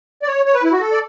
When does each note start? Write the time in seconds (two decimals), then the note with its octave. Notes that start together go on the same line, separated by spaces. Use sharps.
0.23 D5
0.27 C#5
0.45 C#5
0.54 B4
0.63 E4
0.72 F#4
0.81 A4
0.92 D5